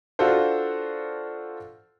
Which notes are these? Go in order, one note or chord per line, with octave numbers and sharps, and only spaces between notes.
D4 F4 F#4 A4 C5